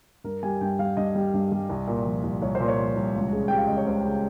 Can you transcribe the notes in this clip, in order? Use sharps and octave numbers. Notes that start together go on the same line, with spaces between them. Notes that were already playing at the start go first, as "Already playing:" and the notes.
G2 A#4
G3 G#5
G2 G5
G3 F5
G2 D#5
G3
G2
G3
C2
A#2
F3
C2
C2 C#5
C5
A#2
C#5
F3
C2
C#2
C#3
G3 G5
F5
C#2 D#5
C#5
C#2 C5
C#3